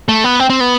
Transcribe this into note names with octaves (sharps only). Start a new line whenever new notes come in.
A3
B3
C4
C4
B3